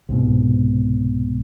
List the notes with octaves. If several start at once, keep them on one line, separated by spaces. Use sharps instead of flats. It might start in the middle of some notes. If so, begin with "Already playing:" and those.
C2 G#2 B2